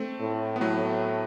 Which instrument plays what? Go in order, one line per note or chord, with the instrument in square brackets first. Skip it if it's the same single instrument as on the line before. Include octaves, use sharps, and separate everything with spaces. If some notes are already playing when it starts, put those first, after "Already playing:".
Already playing: [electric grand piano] A3 C4
[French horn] A2
[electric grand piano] B3
[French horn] A2 [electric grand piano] F#3 A3